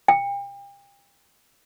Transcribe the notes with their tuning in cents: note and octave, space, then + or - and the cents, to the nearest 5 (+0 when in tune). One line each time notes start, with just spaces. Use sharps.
G5 +35